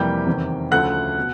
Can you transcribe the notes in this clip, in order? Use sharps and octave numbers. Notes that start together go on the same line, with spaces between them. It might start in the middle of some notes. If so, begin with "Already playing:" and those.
Already playing: F2 C3 E3 G3 A#3 G5 G6
E2 C3 D#3
D2 C#3 F3 A3 F#5 F#6
B2